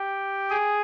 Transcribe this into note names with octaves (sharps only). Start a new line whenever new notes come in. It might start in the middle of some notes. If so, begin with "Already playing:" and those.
Already playing: G4 G5
G#4 G#5